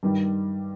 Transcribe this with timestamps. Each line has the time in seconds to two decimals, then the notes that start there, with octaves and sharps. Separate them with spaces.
0.03 G2 D#3 G3